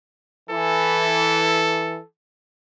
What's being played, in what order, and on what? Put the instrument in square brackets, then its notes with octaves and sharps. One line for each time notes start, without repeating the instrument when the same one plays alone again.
[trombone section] E3 [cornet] A4